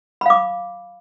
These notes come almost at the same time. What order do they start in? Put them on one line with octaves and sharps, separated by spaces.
B5 F5 D6